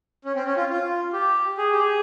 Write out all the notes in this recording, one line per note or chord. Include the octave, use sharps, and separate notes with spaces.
C#4
C4
C#4
F4
F4
G4
G#4
G4
G#4